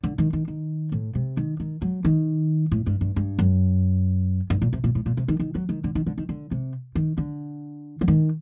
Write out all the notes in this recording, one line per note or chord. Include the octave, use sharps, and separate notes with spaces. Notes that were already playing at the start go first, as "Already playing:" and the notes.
D3
D#3
D#3
D#3
A2
C3
D#3
D#3
F#3
D#3
A2
G2
G2
G2
F#2
G2
A#2
C3
A#2
A2
A#2
C3
D#3
D#3
F#3
D#3
D3
D#3
D3
D#3
D3
C3
D#3
D3
F#3
D#3